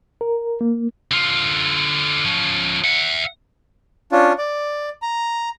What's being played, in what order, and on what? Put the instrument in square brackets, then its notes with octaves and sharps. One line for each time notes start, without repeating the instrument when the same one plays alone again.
[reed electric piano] A#4
A#3
[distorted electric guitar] D3 F4
F3 C#4
E5 F#5
[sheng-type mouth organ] C#4 D4 F4
D5
A#5